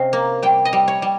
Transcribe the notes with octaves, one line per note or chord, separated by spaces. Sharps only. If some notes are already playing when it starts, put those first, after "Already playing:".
Already playing: C3 C#4 D#5 F5
A#3
G3 G5
D#5
G3
C#5
G3